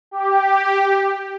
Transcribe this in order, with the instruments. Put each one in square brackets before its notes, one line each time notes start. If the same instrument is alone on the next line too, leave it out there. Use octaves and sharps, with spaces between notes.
[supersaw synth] G4